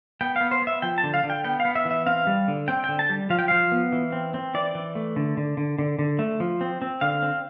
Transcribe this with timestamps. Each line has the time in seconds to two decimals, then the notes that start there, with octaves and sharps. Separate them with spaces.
0.21 B3 G5
0.36 B3 F5
0.51 C5
0.62 B3
0.67 E5
0.82 F3 G5
0.98 A5
1.03 D3
1.14 F5
1.24 D3
1.30 G5
1.44 B3 G5
1.60 F5
1.65 B3
1.75 E5
1.85 E3
1.91 E5
2.06 C4 F5
2.27 G3
2.48 D3
2.68 C4 G5
2.84 D3 G5
2.99 A5
3.10 G3
3.30 F3 F5
3.39 G5
3.48 F3 F5
3.72 B3
3.92 E3
4.12 C4
4.34 C4
4.54 E3 D5
4.75 E3
4.95 A3
5.16 D3
5.37 D3
5.57 D3
5.79 D3
5.99 D3
6.19 A3
6.40 F3
6.61 C4
6.82 C4
7.01 D3 F5
7.22 C4